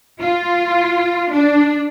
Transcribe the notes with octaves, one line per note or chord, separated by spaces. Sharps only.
F4
D4